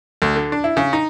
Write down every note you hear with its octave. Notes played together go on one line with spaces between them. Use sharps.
D2
D3
D4
E4
C#3
D#4